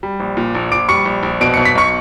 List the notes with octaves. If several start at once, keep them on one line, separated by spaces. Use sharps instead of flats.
G3
A#1
A#2
A#1
A#1 D6 D7
G3 C#6 C#7
A#1
A#1
B2 D7
B1 C#7
B6
B1 C#6 C#7